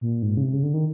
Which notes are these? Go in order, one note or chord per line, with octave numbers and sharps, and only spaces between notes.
A#2
G#2
C#3
C3
C#3
D3
D#3